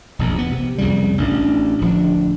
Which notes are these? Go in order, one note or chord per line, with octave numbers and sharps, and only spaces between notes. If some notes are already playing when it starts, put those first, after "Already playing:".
E1 A#1 F2
D#2 B3
C3
C2 F2 C#3 G3
A1 D4
D1 F3 D4